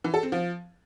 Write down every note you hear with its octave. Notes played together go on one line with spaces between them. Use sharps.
E3
A4
C4
F3